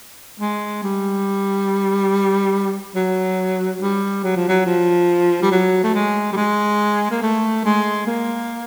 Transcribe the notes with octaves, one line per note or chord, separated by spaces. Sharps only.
G#3
G3
F#3
G3
F#3
F3
F#3
F3
G3
F#3
A3
G#3
G3
G#3
A#3
A3
G#3
A#3